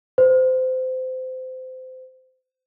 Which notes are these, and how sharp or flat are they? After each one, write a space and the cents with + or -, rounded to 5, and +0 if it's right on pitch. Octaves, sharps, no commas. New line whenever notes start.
C5 -25